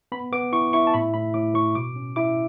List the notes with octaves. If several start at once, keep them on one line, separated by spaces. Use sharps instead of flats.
B3 B5
B3 D6
E4 C#6
E4 C#6
A5
A2 B5
A2 B5
A2 D6
A2 C#6
B2 D6
C#4
E4 D6